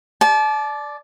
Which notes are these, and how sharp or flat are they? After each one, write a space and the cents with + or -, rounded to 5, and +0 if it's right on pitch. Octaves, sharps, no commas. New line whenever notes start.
D5 +0 A5 -35